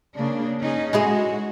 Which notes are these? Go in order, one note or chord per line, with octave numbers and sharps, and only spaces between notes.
C#3 A#3 D4
C#4 D#4 G#4
G#3 E4 F#4 G#4